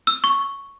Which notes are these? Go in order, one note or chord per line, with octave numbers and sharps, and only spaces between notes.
E6
C#6